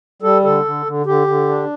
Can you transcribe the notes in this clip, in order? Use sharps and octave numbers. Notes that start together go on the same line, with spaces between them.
G3 A4
D3 A4
D3
D3
D3 G4
D3
D4